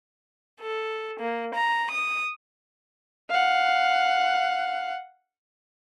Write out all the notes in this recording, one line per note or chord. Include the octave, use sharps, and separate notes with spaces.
A4
A#3
A#5
D#6
F5 F#5